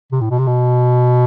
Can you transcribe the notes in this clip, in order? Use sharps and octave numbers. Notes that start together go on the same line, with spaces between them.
C3
A2
B2
C3
B2